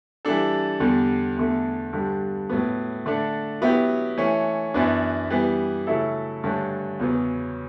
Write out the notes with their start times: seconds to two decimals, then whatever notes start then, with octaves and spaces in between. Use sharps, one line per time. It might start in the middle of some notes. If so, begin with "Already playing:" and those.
0.25 E3 G3 D4 A4
0.80 E2 D3 G3
1.37 E2 D3 A3
1.93 G2 D3 G3
2.49 A2 F#3 B3
3.06 D3 A3 D4
3.61 F#3 B3 E4 G4
4.18 E3 A3 C#4
4.74 F#2 E3 B3 D4
5.30 E3 G3 B3
5.87 C#3 F#3 A3 E4 A4
6.44 G2 D3 A3 C#4
6.99 E2 C#3 F#3 B3